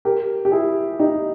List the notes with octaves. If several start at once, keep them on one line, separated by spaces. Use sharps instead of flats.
G4 A#4
G4
E4 G#4
D#4 G4